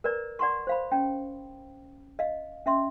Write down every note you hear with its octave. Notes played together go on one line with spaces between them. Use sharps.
A#4 B4 D5 A#5
D5 F#5 A#5 C6 C#6
C5 F5 B5
C#4 G5
D#5 F5
C#4 E5 C6